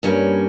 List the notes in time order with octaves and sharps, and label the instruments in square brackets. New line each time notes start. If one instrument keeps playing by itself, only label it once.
[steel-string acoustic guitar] G2 G3 A#3 C#4 C#5